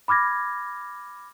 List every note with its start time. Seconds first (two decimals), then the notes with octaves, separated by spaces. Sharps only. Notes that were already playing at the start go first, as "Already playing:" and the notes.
0.08 B5 D6 F6 G#6 A#6